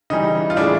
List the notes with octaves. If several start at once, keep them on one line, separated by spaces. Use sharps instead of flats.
C#3 E3 G3 D#4
F4
A2 E3 G#3 D4 E4